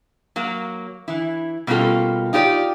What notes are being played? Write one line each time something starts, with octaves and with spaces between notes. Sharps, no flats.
F#3 A#3
E3 E4
B2 G3 A#3 C#4 F4 A4
D#4 F4 G4 C5 D5